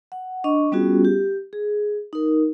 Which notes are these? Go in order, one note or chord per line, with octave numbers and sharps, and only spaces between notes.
F#5
D4 D#5 C#6
G3 B3 C#4 F4 F#4 G#4
G4
G#4
D#4 A#4